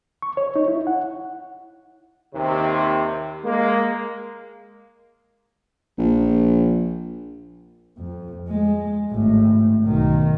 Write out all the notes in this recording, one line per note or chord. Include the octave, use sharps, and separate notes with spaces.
C#6
C#5
D#4
E4
F#5
D#2 C3
G#3 A#3
A#1
F2
G#3
G#1 A2
B1 D#3